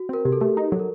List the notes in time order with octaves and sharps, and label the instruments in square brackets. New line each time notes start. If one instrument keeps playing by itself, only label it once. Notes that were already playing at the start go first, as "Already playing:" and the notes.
Already playing: [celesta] F#4
[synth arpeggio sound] C4 [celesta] A#4
[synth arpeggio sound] C3 [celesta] G4
[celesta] A4
[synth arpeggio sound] A3 [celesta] G4
[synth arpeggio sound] D#4
[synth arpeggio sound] F#3 [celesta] A4
[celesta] A#4